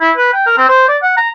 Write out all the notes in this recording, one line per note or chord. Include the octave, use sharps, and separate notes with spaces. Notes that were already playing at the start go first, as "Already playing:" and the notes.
E4
B4
G5
A#4
C4
C5
D5
F#5
A#5